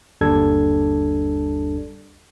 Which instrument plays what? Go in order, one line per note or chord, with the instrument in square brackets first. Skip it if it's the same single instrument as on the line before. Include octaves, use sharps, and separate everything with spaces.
[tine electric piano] G1 D#2 G3 D4 A4 G#6